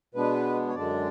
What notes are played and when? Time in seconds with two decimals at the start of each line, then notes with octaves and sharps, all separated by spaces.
0.14 B2 G#3 B3 D4 B4
0.69 C#5
0.75 F#2 D3 G#3 D4 D5